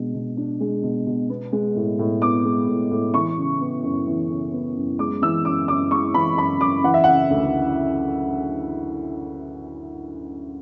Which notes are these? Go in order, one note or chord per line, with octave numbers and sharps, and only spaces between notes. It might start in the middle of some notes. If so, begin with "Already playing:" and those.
Already playing: B2 G#3 D4
B2
D4
G#3
B2
B2
B3
G#3
A2
A2
B3 D6
G#3
A2
A2
E3 C#6
C#3
B3
F#2
E3
C#3
B3
F#2
G#3 D6
E3 E6
F#2 D6
F#2 D6
G#3 C#6
E3 B5
F#2 B5
F#2 D6
E3 F#5
E5
C#3 F#5
D2